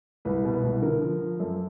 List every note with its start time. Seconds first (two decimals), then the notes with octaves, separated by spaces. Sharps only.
0.25 C2 B4
0.45 B2
0.53 B4
0.63 C2
0.82 D3 A#4
1.01 F3
1.20 F3
1.40 F#2 A4